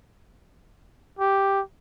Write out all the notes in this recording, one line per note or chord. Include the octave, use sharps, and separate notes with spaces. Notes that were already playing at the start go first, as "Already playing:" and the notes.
G4